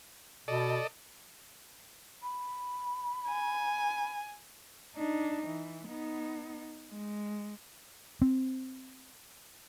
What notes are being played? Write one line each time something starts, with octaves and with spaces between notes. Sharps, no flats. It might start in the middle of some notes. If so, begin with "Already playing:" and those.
B2 A4 D5 D#5
B5
G#5
D4 D#4
E3
B3 D#4
G#3
C4